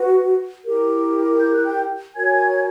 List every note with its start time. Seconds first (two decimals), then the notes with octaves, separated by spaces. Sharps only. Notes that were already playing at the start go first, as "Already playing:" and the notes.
Already playing: F#4 B4
0.65 E4 G4 A#4
1.41 G6
1.53 F#6
1.66 G5 G6
2.15 F#4 A#4 C#5 G#5 G#6